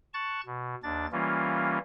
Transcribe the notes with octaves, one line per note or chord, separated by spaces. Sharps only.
A5 C#6 F#6 A6
B2
D#2 D4 A6
E3 G3 A#3 C#4 F4